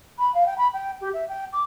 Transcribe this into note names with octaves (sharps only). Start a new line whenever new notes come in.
B5
F5
G5
B5
G5
G4
E5
G5
D6